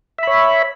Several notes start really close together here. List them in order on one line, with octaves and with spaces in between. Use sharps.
E5 B5 C#5